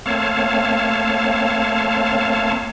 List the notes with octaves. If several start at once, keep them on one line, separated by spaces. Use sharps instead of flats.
A3 A#3 C4 C#5 F5 A5